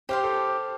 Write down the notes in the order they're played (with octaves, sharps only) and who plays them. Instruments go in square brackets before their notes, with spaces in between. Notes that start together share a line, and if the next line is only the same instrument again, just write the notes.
[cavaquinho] G4 F5 C6 [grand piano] C5
[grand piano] A4